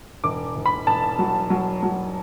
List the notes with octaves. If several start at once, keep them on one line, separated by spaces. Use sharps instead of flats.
E1 D6
E1
B5
E1 A5
F#3
F#3
F#3